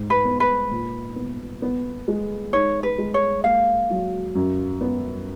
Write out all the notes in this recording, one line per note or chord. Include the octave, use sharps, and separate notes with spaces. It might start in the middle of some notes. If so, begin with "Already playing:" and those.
Already playing: G#2
B4
B3
B4
A#2
B3
B3
G#3
D#4 C#5
B4
G#3
C#5
A#3 F5
F#3
F#2
B3